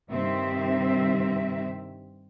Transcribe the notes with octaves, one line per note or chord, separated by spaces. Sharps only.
G2 C3 D#3 C4 E5